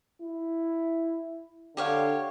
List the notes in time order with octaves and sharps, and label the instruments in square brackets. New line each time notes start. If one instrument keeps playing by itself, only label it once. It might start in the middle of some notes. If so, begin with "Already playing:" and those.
[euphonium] E4
[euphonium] D3 [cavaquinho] G4 C#5 F5